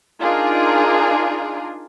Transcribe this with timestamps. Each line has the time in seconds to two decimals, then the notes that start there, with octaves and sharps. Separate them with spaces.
0.21 D4 D#4 F4 G#4 A#4